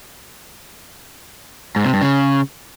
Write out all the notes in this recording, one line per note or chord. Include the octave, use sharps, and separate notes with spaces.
G#2
C3
G2
C#3